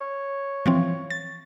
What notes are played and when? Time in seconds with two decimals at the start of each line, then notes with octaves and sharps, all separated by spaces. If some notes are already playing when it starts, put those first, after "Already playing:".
0.01 C#5
0.66 E3 F3 C4
1.10 A6